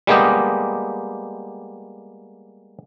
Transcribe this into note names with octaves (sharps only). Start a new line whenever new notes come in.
G3 G#3 A#3 B3 G4 D#5